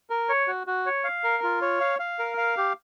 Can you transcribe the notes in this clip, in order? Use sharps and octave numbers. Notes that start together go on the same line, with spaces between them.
A#4
C#5
F#4
F#4
C#5
F5
A#4
F4
C#5
F5
F5
A#4
F5
G4